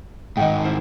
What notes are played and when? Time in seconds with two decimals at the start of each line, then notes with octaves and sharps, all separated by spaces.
0.37 G#2 D#3 D#5 F#5 G5
0.65 G3 E4 C5